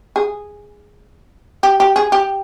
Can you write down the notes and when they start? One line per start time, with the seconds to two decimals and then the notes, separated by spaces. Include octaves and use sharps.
0.16 G#4
1.63 G4
1.80 G4
1.96 G#4
2.12 G4